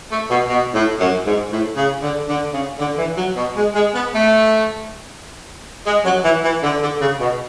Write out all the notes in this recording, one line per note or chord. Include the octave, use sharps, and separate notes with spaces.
A3
B2
B2
A2
F#2
G#2
A2
C#3
D3
D3
C#3
D3
E3
F#3
B2
G#3
G#3
B3
A3
G#3
F#3
E3
E3
D3
D3
C#3
B2